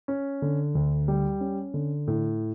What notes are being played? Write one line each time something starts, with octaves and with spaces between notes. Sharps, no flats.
C#4
D3
D2
G3
C#4
D3
A2